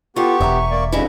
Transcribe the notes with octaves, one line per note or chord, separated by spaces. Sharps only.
B3 F4 G4 A4 C#6
E1 E5 G#5 A#5
A#3 D5
F2 G#2 C#3 G3 C#4 E4 D#5